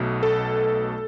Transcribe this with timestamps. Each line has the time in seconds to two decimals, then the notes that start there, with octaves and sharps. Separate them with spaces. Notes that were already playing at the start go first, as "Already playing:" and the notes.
Already playing: B1 B2 A3
0.23 A4